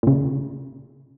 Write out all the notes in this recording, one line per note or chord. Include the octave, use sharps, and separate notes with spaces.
A#2 C#3